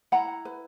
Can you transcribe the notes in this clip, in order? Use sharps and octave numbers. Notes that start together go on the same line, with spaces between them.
E4 F#5 A#5
B4